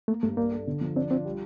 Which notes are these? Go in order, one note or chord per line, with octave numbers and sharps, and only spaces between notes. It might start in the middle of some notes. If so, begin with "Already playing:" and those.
A3 A#3
G2 A3
A#3 D4
A4
D3
F3
C4 D4
C4 F4
G3